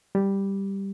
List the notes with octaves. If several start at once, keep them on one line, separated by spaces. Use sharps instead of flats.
G3